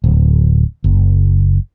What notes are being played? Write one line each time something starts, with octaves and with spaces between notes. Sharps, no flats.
D1
F#1